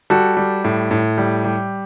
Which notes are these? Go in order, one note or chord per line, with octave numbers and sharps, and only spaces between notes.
G3 F#4 A4
G3
A2
A2
G3
G3